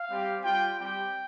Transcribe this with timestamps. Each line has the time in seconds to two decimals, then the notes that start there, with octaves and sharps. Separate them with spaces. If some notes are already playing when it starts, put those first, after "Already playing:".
Already playing: F5
0.09 G3 C4 G4
0.43 G3 F4 G5
0.78 G3 C4 G4 G5